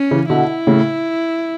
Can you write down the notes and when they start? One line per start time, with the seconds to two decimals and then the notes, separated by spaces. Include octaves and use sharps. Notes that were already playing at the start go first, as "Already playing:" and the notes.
Already playing: C#4
0.11 C#3 E3
0.30 B2 D3 E4
0.67 A2 C#3